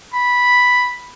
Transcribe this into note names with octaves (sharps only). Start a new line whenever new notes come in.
B5